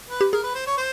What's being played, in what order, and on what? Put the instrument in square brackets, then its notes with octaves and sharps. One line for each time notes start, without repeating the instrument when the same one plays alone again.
[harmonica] B4
[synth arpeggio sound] G4
[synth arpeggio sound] G#4 [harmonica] A#4
[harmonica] B4
C5
C#5
C5